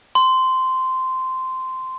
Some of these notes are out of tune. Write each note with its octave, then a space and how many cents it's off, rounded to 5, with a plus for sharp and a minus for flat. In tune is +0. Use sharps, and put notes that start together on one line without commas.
C6 -10